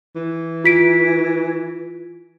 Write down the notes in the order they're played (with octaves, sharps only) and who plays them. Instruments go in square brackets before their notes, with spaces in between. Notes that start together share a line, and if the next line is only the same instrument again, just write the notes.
[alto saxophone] E3
[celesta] F4 B6 D7